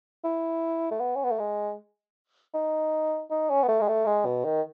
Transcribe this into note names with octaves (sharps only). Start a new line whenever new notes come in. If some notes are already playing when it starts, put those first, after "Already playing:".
E4
A3
B3
C#4
B3
A3
G#3
D#4
D#4
C#4
B3
A3
G#3
A3
G#3
B2
D#3